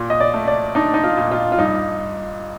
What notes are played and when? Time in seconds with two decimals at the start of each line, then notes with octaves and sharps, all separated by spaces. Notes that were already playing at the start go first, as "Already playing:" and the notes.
Already playing: A#2
0.10 D#5
0.20 D5
0.34 A3
0.47 D5
0.75 D4 D#4
0.94 D#4
1.04 F4
1.17 A#2
1.31 F4
1.52 F4
1.58 G2 D#4